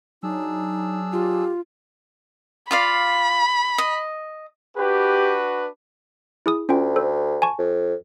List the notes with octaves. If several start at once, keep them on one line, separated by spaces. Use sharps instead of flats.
F#3 D4 D#4 G#4 E6
F4 G4
F4 D5 F5 B5
D#5
D4 F#4 G4 B4
E4 G#4 D#6
D2 C#4 F4 G5
A4 C5
G#5 A5 C#6
F2